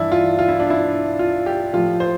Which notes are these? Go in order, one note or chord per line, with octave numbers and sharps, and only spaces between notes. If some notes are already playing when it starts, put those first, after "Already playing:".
Already playing: G2 E3 D4 E4
F4
F4
E4
D4
E4
F4
G4
A2 F3 F4
C5